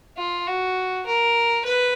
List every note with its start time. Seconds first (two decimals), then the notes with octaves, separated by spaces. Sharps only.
0.17 F4
0.47 F#4
1.06 A#4
1.65 B4